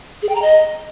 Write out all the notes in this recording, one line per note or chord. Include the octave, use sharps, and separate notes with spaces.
G#4
G5
A#5
D#5